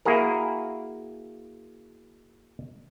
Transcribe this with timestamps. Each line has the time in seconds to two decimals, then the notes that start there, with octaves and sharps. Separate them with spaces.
0.05 A#3 E4 F#4 G#4 A#4